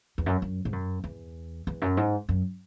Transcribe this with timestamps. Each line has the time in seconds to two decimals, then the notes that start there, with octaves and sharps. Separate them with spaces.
0.18 E2
0.26 F#2
0.42 F#2
0.65 G#2
0.73 F#2
1.04 E2
1.67 E2
1.82 F#2
1.97 G#2
2.29 F#2